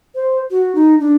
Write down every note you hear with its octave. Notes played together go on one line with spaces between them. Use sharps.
C5
F#4
D#4
D4